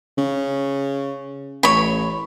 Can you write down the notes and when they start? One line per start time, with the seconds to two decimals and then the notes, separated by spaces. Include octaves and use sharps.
0.18 C#3
1.63 A1 C#5 B5